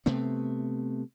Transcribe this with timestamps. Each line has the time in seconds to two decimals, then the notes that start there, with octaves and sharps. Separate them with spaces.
0.06 C3 A3 B3 C4